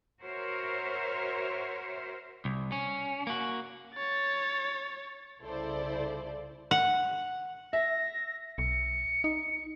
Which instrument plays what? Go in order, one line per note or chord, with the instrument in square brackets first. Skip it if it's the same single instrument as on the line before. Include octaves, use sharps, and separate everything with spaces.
[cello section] F#4 A#4 C5 C#5 E5
[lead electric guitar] C2
C#4
A#3 F#4
[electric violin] C#5 A6
[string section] C2 C#3 E4 A4 C5 D5
[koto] F#5
[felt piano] E5 [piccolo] A#6
[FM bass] B1 [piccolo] C#7
[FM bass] D#4